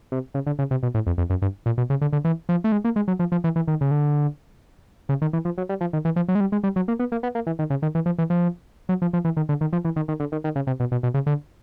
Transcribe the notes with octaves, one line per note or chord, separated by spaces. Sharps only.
C3
C#3
D3
C#3
C3
B2
A2
F2
F2
F#2
G2
A#2
B2
C#3
D3
D3
E3
F3
A3
G#3
A#3
G#3
F#3
F3
F3
E3
E3
D#3
C#3
D3
C#3
D#3
E3
F3
F#3
G3
F3
D#3
E3
F3
F#3
G#3
G3
G#3
G3
F#3
A#3
B3
A#3
B3
A#3
E3
D#3
C#3
D#3
E3
F3
E3
F3
F#3
F3
F3
E3
D#3
D3
D#3
F3
E3
D#3
D#3
D3
D#3
D#3
C#3
C3
B2
B2
B2
C#3
D3